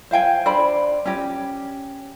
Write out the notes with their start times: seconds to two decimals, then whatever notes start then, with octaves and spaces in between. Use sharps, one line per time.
0.11 C5 F5 G5 G#5
0.46 D4 C5 D5 B5
1.05 C#4 G4